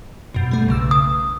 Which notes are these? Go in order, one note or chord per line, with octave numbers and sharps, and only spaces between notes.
F#2 B2
G3 A3
B1 C#3 E6
D#6